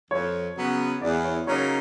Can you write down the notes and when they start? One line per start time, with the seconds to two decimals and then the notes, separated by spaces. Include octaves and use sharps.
0.11 F2 C#5
0.57 C#3 F#3 B3
1.01 E2 D5
1.25 C#5
1.47 C#3 F#3 A#3 D#4 C#5